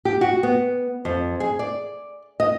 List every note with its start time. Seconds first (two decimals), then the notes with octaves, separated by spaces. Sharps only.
0.05 G4
0.21 F#4
0.43 B3
1.05 F2
1.40 G#4
1.59 D5
2.40 D#5